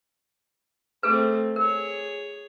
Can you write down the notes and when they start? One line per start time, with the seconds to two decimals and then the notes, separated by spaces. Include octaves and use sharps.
1.03 A3 C4 G#4 A4 B4
1.56 G#4 A#4 C#5